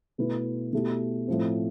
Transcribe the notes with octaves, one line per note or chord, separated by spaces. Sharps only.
B2 A3 E4 B4
B2 A3 E4 G4
A2 F3 C4